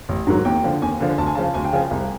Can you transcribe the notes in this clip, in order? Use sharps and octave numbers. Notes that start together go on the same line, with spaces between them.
A1
G#2 D#3 F#3
D#2 G5
D3 F3
D#2 G#5
D3 F3
D2 A5
G#5
C#3 F3 A5
D2 G#5
G5
C#3 F3 G#5
C2